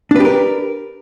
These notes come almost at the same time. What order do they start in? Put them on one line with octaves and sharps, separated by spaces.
D4 B4 G4 A#4